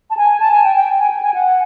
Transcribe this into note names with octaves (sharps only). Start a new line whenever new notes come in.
A5
G#5
A5
G#5
G5
G5
G#5
G5
G#5
F#5